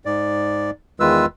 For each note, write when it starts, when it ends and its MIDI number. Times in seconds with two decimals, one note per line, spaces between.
0.05 0.71 44
0.05 0.71 74
1.00 1.26 40
1.00 1.26 51
1.00 1.26 56
1.00 1.26 65
1.00 1.26 71
1.00 1.26 88